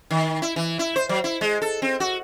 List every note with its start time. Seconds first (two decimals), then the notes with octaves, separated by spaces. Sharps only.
0.11 D#3
0.42 E4
0.56 E3
0.79 E4
0.96 C5
1.09 F#3
1.24 E4
1.41 G#3
1.62 A4
1.82 C4
2.00 F#4